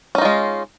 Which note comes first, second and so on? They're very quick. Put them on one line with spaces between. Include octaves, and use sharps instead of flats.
C#4 D#4 F4 G#3